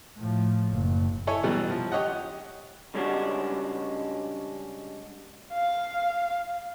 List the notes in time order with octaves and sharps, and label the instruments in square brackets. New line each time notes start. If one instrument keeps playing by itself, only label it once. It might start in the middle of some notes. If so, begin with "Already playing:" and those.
[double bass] A2 F3
F#1
[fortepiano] E4 A4 C#5 G#5
B2 E3 F#3 G3
F3
G4 C#5 D#5 F#5
[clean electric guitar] C#3 G3 G#3 C#4 D4 F#4
[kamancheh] F5